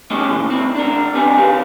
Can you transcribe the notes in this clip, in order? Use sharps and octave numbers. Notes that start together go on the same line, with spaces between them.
A3 C#4 D#4 G4 G#4 D#5
A#2 E3
C4 E4
D4 A#4
C4 D4 G4 B4 D#5 G#5
G4 A#4 F5